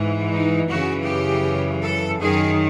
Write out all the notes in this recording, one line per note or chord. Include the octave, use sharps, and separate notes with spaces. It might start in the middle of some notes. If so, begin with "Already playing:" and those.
Already playing: G#2 E3
D#4
F#2 C#3 E3 F#4
G4
A4
F#2 D#3 G#4